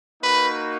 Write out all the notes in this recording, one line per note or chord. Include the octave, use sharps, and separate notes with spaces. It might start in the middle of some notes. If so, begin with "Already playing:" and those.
A#3 D#4 F#4 B4